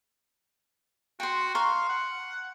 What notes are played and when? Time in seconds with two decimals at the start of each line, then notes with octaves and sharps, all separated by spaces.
1.20 F#4 G5 C6
1.55 F5 A#5 C6 C#6
1.89 F#5